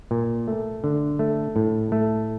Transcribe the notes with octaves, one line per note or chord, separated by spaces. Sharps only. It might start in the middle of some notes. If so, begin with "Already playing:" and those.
A#2
A3
D3
A3
A2
A3